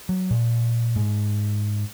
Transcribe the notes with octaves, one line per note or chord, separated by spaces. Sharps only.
F#3
A#2
G#2